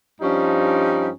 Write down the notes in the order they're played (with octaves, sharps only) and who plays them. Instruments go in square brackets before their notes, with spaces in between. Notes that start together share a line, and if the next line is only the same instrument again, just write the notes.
[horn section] G2 F3 G3 C#4 D#4